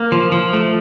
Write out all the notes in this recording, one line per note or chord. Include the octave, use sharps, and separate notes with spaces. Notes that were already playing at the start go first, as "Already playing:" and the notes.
Already playing: A#3
F3
F3
A3